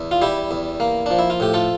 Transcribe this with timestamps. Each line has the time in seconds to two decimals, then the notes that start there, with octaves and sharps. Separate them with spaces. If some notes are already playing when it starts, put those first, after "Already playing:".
Already playing: E2
0.11 F4
0.22 G3 E4 G4
0.51 E2
0.80 A#3
1.06 F3 D4
1.19 E4
1.30 F4
1.40 A2 G4
1.54 F4 A4